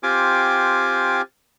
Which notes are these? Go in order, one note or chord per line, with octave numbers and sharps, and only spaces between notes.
C4 F4 G4 G#5 D6